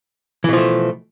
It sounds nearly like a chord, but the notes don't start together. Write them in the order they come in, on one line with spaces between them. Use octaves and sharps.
E3 B2 F3 A3